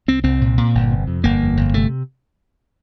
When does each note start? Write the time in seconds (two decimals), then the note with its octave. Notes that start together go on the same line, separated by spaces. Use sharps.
0.08 C2 C4
0.24 C2 C4
0.41 A#2
0.57 A#2
0.75 G1
0.91 C3
1.07 F2
1.24 G1 A#3
1.41 F2
1.57 G1
1.74 C3 A3